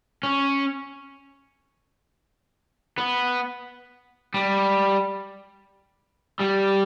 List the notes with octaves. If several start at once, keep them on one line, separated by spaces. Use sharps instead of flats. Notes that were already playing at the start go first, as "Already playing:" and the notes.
C#4
B3
G3
G3